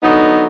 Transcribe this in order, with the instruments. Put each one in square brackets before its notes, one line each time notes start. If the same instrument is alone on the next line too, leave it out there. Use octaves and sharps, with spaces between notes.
[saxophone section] D3 F#3 B3 D#4